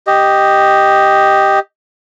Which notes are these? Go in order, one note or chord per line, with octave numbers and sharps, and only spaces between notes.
G4 D#5